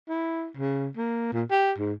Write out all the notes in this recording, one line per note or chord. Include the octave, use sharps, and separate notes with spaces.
E4
C#3
A#3
A#2
G4
G#2